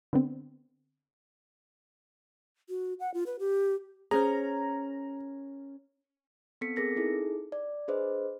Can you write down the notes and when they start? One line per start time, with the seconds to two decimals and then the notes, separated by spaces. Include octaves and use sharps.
0.13 D3 B3 C4
2.69 F#4
3.00 F#5
3.14 F4
3.26 B4
3.39 G4
4.11 C#4 G#4 A#4 C5 A#5
6.61 B3 C4 A4 B6 C#7
6.76 C4 G#4 A#4 A#6 C#7
6.96 D#4 E4 G#4 A4
7.52 D5
7.88 D4 G#4 B4 C5 D#5